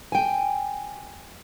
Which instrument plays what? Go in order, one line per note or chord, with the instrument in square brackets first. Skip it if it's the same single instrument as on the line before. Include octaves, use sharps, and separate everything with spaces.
[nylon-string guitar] G5 G#5